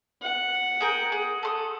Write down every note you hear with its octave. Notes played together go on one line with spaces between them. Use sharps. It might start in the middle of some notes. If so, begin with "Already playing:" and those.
F#5
G#4 A#4 G5
G#4
A4 C6 D#6